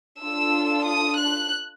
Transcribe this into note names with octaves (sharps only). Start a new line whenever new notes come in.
D4 F4 A4 E6
D#6
F#6